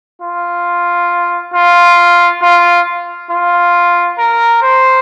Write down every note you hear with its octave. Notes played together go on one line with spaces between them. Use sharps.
F4
F4
F4
F4
A#4
C5